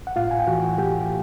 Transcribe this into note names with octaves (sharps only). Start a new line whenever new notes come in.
F#5
A2 F4 F5
G#5
G5
E3 F#4 F#5
A3 G4 G5